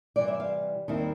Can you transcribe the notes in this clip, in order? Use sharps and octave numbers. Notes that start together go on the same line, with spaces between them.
C3 E3 G3 D5
E5
F5
D#2 D#3 G3 C4 E4